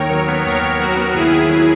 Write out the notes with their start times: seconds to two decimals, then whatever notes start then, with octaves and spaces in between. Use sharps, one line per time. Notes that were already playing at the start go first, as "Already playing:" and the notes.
Already playing: D#2 D#3 A#4 C#5
0.10 F#3
0.28 B3
0.45 D#2 A#4 C#5
0.62 D#3
0.80 F#3 F#4 A#4
0.97 B3
1.14 D#2 E4 G#4
1.31 D#3
1.50 F#3